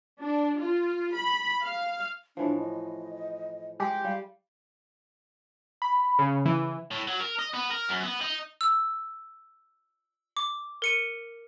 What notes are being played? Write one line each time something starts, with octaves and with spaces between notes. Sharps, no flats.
D4
F4
B5
F5
A2 E3 F3 D4
D#5
G#3 G4
G3 F5
B5
C#3
E3
A2
F#3
A#4
D#5
B3
A#4
F#2
B3
D#4
E6
D6
A#4 C#7 D#7